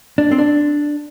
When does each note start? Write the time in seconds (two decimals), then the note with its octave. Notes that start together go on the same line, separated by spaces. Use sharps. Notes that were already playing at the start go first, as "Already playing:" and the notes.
0.18 D4
0.31 C4
0.38 D4